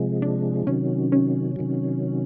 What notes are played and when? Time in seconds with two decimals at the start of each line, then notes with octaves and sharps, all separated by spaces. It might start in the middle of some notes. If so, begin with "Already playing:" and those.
Already playing: C3 F3 G#3
0.22 D4
0.67 C3 D#3 F#3 C#4
1.12 C#4
1.56 C3 D#3 F#3